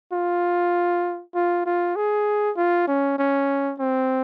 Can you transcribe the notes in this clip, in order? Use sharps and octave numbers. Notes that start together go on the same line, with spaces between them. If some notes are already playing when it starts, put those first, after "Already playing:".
F4
F4
F4
G#4
F4
C#4
C#4
C4